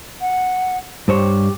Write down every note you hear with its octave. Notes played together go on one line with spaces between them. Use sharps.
F#5
G2 G4 C5 C#5